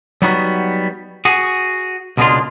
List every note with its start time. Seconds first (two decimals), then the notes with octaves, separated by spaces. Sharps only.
0.22 F#3 G3 B3 D#4 F4 F#4
1.25 F#4 G#4
2.17 C#2 B2 G#3 A#3 D4 F4